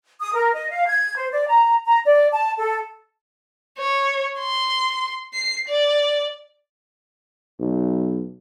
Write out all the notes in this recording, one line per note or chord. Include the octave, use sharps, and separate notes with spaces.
D#6
A#4
D#5
F5
G#6
C5
D5
A#5
A#5
D5
A5
A4
C#5
C6
C7
D5
B1